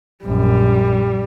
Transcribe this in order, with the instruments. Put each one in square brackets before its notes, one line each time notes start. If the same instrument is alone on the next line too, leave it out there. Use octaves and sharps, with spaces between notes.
[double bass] A#1 F#2 [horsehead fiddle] G3